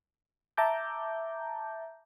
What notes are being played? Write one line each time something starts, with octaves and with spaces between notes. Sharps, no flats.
E5 A5 A#5 D6 G6